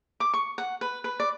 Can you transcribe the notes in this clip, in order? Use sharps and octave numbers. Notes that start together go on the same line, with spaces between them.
D6
C#6
F#5
B4
B4
D5